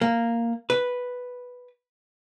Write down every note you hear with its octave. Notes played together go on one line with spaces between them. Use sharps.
A#3
B4